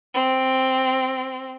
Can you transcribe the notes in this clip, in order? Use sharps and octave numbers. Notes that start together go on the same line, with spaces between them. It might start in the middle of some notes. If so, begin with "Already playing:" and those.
C4